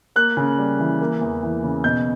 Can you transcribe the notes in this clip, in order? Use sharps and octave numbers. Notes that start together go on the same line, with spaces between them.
A#3 F#6
C#3
G3
E3
A#3
E2
E3
C#3
B2 G6